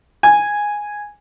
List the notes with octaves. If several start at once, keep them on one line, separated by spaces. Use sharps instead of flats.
G#5